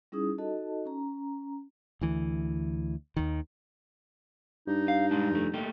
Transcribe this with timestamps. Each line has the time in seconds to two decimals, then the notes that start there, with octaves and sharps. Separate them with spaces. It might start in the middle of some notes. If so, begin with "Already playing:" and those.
0.12 G3 C#4 D#4 E4 G#4 D#6
0.38 D#4 F#4 A4 D#5 A5
0.85 C#4 A#5
2.01 D2 E3
3.16 D#2 D#3
4.67 G2 D#4
4.88 F5
5.11 G#3 D4
5.31 F2 A3
5.54 A3 A#3 G4